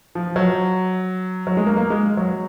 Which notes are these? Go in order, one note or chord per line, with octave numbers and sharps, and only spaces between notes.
F3
F#3
F#3
G#3
A#3
A#3
G#3
F#3